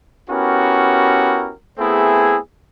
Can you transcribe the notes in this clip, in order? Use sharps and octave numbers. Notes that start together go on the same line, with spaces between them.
B3 C#4 E4 F#4 G4 A#4
A3 B3 C4 E4 G#4